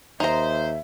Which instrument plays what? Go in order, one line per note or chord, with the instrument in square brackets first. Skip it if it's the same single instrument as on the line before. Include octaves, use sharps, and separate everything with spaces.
[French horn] D#2 [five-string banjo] D#4 A#5 [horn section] C5 [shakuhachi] E5